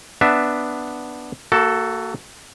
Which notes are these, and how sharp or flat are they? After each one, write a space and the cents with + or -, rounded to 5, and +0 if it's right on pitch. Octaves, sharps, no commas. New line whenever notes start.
B3 +0 D4 +5 E5 +0
A#3 -25 F#4 +20 A4 +0